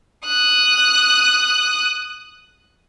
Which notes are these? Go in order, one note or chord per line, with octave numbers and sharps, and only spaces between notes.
D#6 F#6